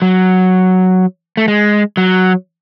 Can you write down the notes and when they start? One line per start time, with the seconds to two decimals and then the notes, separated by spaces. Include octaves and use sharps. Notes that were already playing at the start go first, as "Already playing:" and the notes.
0.02 F#3
1.37 A3
1.48 G#3
1.97 F#3